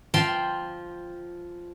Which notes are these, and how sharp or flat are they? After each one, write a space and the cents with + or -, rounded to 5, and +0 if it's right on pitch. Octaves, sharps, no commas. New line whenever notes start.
F3 +0 G5 +0 C6 +0